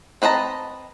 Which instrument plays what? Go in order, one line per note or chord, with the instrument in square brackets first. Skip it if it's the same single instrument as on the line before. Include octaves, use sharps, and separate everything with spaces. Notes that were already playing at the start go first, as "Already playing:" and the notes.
[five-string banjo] C4 B4 D#5 A5 A#5